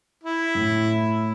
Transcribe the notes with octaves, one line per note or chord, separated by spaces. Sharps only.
E4
A2